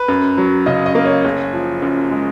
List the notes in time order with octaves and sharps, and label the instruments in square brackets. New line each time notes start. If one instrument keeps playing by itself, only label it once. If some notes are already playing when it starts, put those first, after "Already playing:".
Already playing: [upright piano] B4
F#2
F#3
C#3 D#5
D#5
A#3
C#5
F#1
F3
F#2
G#3